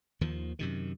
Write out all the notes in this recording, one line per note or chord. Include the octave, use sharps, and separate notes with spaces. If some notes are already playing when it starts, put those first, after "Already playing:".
D#2 D#3 F3
F#2 C3 D#3